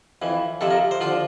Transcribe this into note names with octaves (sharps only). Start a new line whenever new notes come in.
F2 E3
F2 C3 F3 A4
A#4
C5
D3 F3 F4